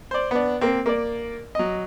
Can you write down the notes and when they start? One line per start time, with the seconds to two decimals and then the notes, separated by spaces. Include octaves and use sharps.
0.11 C5 D5
0.31 B3 D4
0.61 A#3 C4
0.86 A#3 D5
1.55 F#3 D#5